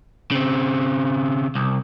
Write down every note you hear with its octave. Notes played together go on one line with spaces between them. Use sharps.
C#3 C4
C2